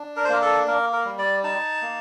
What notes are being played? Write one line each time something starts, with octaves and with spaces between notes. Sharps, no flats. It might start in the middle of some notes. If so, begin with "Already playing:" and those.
Already playing: D4
A#4
C5
A#3 A#4
A4
A#3 A#4
A#4
G3
D5
D#4 A5
A#3